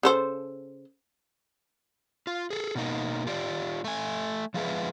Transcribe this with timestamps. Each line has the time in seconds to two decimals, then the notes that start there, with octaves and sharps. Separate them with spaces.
0.03 C#3 A4 C5
2.27 F4
2.50 G#4 A4
2.75 B2 A#3 D#4
3.27 F4 G4 D5
3.84 A3 G#5
4.54 F3 G#3 F4 G#4 B4 E5